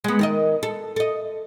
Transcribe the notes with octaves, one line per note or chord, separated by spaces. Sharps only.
G#3 B3
D#3 A#4 D#5
A4
A4 D#5